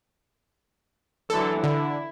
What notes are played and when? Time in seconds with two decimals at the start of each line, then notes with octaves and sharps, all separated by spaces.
1.30 D3 E3 F#3 A4
1.64 D3 E4